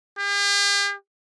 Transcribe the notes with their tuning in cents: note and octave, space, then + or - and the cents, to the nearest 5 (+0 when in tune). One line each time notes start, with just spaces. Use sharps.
G4 +45